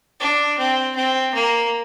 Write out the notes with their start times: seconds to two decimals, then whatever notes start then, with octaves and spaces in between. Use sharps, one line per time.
0.20 D4
0.58 C4
0.96 C4
1.34 A#3